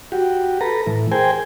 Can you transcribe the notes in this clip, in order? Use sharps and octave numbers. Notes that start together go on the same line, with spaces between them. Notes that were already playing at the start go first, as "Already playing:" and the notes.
F#4 G4
A4 B4 A#5
A2 E3
G#4 A#4 C5 G5 G#5